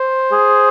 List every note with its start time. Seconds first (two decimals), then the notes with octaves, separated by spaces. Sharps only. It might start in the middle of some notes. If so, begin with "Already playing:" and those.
Already playing: C5
0.32 G#4